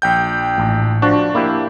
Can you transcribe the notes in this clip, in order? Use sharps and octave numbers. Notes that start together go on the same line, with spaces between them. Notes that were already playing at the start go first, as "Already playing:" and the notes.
A#1 G5 G6
A1
F3 D4 F#4
A#3 E4 G4